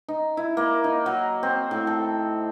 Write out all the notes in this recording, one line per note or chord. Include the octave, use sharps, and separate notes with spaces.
D#4
E4
A#3
D#4
F#3
C4
A2
A4